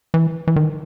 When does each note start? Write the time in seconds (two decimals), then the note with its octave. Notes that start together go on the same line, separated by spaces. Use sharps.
0.14 E3
0.47 E3
0.56 D#3